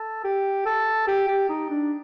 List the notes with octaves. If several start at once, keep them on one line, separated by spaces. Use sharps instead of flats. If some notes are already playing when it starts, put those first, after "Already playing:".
Already playing: A4
G4
A4
G4
G4
D#4
D4